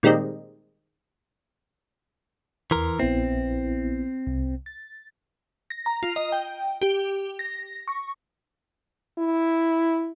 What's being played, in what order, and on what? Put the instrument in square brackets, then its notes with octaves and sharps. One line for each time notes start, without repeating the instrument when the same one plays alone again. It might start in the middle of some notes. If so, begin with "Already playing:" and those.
[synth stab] A#2 D#3 G3 G#3 C4 D#4
[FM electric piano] E2 C6 [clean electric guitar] E3 A#4
[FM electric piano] A#1 B3 E4 [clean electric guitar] C4
[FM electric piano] C2
A6
[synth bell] A#6
A#5
F4
D#5
G5
G4
A#6
C#6
[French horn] E4